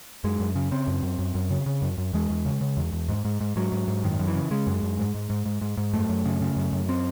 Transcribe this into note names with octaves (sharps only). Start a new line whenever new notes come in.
F#2 G#3
F#2
C#3
C#3 C4
F#2
F#2
F#2
F#2
C#3
C#3
F#2
F#2
E2 G#3
E2
C#3
C#3
E2
E2
G#2
G#2
G#2
G#2 F#3
G#2
G#2
F#2 D#3
F#2
E3
C#3
C#3 G#3
F#2
F#2
G#2
G#2
G#2
G#2
G#2
G#2
F#2 A3
F#2
C#3
C#3
F#2
F#2
C4